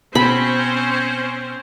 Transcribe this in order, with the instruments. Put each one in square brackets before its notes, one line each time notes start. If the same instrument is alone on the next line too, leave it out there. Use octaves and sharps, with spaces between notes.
[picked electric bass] B2 [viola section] C4 C#4 C5 [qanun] B5